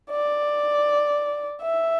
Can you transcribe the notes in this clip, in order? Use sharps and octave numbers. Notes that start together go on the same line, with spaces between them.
D5
E5